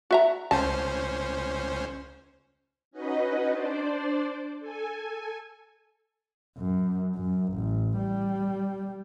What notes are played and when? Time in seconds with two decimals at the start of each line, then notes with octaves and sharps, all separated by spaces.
0.11 F#4 E5 A#5
0.51 C#2 C#4 C5 A5
2.91 C#4 D#4 F#4 B4 D#5
3.50 D4 C5 D5
4.60 A4 G#5
6.58 F#2
7.15 F#2
7.53 A1
7.98 G3